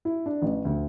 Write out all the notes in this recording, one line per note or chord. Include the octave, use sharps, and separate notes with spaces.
E4
D4
A1
D2